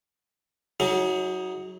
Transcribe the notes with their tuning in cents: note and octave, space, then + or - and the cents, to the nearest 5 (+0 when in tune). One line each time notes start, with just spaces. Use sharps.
F#3 +0 D#4 +40 G#4 +0